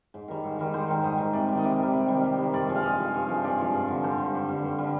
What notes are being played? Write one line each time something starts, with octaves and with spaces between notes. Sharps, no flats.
G#2
D#3 G3
G#2
D#3 G3
G#2 C5
D#3 G3
G#2 D#5
D#3 G3
C3 D5
D#3 G3
D#5
C3 D5
D#3 G3
C3
D#3 G3
C3
D#3 G3
G2 D5
F3 G#3
F5
G2 D#5
F3 G#3
G2
F3 G#3
G2 D5
F3 G#3
G2
D3 G3
G2 C5
D3 G3
G2
D3 G3
G2
D3 G3